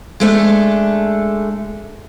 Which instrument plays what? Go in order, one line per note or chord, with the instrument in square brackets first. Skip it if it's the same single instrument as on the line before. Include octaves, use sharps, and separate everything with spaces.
[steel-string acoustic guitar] G#3 A3 C#4 D4